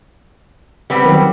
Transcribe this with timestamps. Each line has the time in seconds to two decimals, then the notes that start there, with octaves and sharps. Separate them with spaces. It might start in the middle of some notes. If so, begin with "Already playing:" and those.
0.90 G3 B3 C4
1.05 D#3 F#3